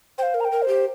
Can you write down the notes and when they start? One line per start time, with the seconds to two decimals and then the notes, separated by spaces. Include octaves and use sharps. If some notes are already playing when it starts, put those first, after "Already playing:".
0.18 C5 G5
0.23 F5
0.34 A#4
0.40 A#5
0.45 G5
0.52 A#4
0.62 C5
0.68 G4